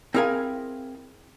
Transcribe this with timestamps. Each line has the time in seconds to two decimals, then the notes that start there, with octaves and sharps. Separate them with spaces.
0.14 C4 E4 G#4 A#4 F5 G#5